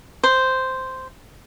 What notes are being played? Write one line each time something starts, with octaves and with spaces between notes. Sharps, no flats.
C5